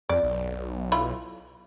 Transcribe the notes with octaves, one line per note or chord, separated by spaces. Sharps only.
F2 D5
B1
E3 F4 B5